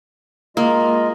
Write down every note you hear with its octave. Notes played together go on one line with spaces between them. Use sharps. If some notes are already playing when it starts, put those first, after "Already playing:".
G#3 A#3 F4 D#5